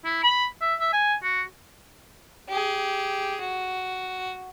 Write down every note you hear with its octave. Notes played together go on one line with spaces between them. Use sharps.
E4
B5
E5
E5
G#5
F#4
G4 G#4
F#4